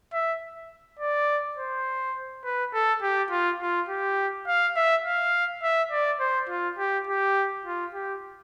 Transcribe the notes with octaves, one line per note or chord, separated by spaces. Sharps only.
E5
D5
C5
B4
A4
G4
F4
F4
G4
F5
E5
F5
E5
D5
C5
F4
G4
G4
F4
G4